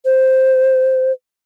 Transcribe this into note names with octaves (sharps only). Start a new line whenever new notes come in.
C5